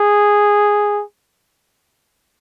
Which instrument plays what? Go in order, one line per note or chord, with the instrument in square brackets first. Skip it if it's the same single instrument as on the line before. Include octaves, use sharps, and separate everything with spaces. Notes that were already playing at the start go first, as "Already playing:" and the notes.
Already playing: [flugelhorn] G#4